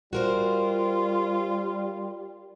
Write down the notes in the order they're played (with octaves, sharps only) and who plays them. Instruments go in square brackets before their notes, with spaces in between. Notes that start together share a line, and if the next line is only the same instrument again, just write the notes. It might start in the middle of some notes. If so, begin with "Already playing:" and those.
[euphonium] G3 [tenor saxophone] F4 [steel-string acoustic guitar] F#4 A#4 C5